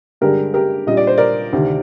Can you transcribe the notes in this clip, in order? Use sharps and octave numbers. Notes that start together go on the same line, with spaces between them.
G2 D3 G#3 D4 G4 A#4
G4 A#4
A#2 G3 D4 D#5
D5
C5
A#4 D5
D2 C3 D#3